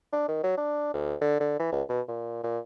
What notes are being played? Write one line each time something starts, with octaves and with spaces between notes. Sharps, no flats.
D4
D#3
F#3
D4
D2
D3
D3
E3
C#2
B2
A#2
A#2